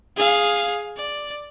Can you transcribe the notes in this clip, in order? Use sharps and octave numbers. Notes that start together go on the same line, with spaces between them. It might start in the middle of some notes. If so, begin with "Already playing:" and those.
G#4 F5
D5